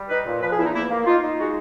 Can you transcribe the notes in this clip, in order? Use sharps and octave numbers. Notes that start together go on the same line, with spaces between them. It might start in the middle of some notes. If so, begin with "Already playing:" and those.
Already playing: G3
D#4 B4
A#2
F3 B4
G#4
E2 E4
D#4
A#3 E4
A#3
D#4 F4
D#4
G#3 F#4